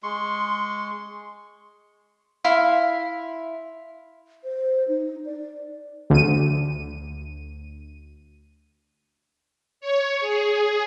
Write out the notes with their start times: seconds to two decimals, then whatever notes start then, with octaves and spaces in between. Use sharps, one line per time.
0.03 G#3 C6 C#6
2.44 E4 F5 C6
4.44 C5
4.88 D#4
5.25 D5
6.10 D2 D#7
9.81 C#5
10.20 G#4